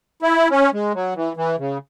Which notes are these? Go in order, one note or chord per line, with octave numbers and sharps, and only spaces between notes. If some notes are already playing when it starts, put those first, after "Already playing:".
E4
C#4
G#3
F#3
E3
E3
C#3